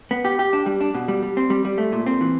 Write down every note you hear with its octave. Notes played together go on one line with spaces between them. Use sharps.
B3
G4
G4
D4
G3
D4
B2
G3
G3
C4
G3
G3
A3
A#2
C4
E3